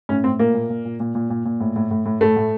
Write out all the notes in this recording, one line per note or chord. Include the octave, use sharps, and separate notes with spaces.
A2 C#4
A2 C4
A#2 A#3
A#2
A#2
A#2
A#2
A#2
A#2
A#2
A2
A2
A2
A2
A2 A3
A2